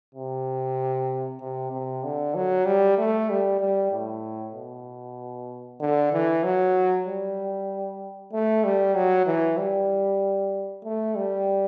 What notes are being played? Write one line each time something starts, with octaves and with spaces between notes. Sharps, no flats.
C3
C3
C3
D3
F#3
G3
A3
G3
G3
A2
B2
D3
E3
F#3
G3
A3
G3
F#3
E3
G3
A3
G3